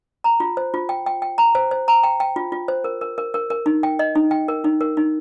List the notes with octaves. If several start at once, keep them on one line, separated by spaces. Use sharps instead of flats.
A#5
F4
C5
F4
G5
G5
G5
A#5
C5
C5
A#5
G5
G5
F4
F4
C5
A#4
A#4
A#4
A#4
A#4
D#4
G5
D#5
D#4
G5
A#4
D#4
A#4
D#4